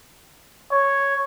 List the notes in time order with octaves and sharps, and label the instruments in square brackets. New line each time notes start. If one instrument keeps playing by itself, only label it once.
[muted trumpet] C#5